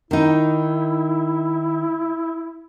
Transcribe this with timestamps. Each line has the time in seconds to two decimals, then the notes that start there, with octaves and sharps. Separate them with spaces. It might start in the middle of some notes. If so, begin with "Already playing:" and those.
0.11 D#3 D#4 E4